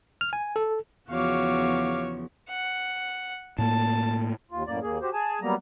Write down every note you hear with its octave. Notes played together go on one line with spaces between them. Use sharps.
F6
G#5
A4
E2 C#3 F3 F#4 C#5 F5 D6
F#5
A2 A#3 A5
D#2 F4
F#2 A2 A#3 D5
D#2 A#3 G#4
F#4 G4 C5
G#4 G#5 A5
F#3 G3 A#3 B3 A#5